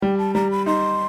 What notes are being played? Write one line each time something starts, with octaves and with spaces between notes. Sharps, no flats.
G3 G5
A5
G3 A#5
B5
D#4 C6